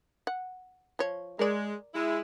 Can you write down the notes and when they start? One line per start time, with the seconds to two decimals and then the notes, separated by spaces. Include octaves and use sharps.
0.27 F#5
0.99 F3 C#5
1.39 G#3 A#4 D5
1.94 G#3 E4